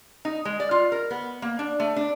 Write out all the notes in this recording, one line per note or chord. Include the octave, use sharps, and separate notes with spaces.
D#4
G#3
D5
F4
A#4
B3
A#3
D4
A3
D4